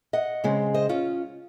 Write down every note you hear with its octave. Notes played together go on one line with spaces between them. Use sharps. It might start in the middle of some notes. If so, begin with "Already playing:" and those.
D#5 F#5
C#3 G#3 C4
C5 D#5
C#4 F4